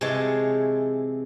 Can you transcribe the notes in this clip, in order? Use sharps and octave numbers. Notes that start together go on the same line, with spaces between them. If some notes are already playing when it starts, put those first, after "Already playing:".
C3 E3 G#3 C#5 A5